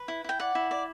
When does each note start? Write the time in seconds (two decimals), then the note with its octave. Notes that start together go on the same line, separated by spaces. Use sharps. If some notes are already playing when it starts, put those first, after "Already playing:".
Already playing: B4
0.08 E4
0.24 E4 G5
0.40 D5 F#5
0.55 E4
0.71 D5